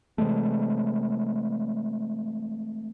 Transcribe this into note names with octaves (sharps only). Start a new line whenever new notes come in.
C3 E3 G#3 A3